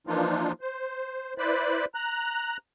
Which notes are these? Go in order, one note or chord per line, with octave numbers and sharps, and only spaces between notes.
E3 F3 A#3 D4 D#4 F4
C5
E4 B4 C5 D5 B5
A#5 F#6